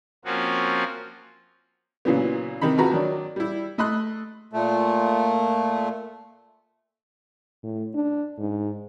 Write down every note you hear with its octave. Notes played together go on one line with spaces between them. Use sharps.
F3 A#3 C4 C#4 F4 F#4
A#2 C#3 E3 F#3 B3
C3 D#3 D#4 B5
G#1 F3 F#4 B4 A#5
D#3 F#3 D4
G3 E4
A3 D#5 B5 C6 F#6
A#2 A3
A2
D4
G#2